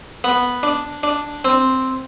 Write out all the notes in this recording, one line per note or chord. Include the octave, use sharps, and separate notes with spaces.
B3
D4
D4
C4